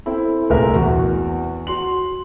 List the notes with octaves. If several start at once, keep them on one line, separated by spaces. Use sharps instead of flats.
C4 E4 A4
D#1 C2 A2 G#4 A#4 E5
E2 F#4 C#6
F#4 C6 F#7